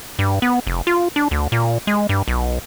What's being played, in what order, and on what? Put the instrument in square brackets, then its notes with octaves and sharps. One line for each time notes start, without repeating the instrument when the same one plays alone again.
[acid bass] G2
B3
F1
F4
D4
D2
A#2
G#3
G2
B1